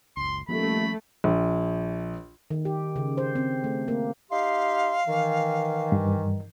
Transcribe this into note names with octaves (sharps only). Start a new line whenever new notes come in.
F#1 C#2 C6
D#1 F3 A3 A#3 C#4 B5
A#1
D#3
G4
C#3
C5
C4
A3
A#3
D#4 G4 F5 C6
D#3 E3
G2